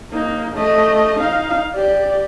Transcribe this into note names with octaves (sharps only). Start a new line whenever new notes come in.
A#3 D#4
A3 D#5
D#4 F5
G4 D5